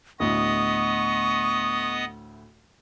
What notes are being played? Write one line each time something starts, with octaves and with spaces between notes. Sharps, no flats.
D2 A2 B3 D#5 C#6 D#6